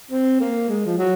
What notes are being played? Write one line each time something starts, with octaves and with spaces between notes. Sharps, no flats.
C4
A#3
G#3
F3
F#3